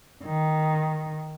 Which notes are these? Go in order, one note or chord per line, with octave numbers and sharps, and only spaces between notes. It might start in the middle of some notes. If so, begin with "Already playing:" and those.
D#3